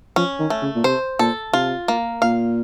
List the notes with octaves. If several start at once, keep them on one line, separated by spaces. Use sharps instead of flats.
F3 C#4
D#3
A3
C#3
A#2
C3 C5
A#2 A4
C3 F4
A#3
A#2 F5